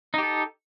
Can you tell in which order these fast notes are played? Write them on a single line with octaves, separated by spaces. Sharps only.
D#4 G4 A4